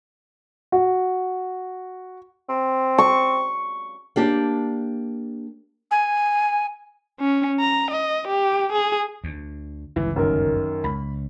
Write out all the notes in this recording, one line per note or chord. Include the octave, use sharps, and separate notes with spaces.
F#4
C4
C#6
A#3 D4 G4
G#5
C#4
A#5
D#5
G4
G#4
D2
G1 C#2 E3
F#2 D#3 A#4
C#2 B5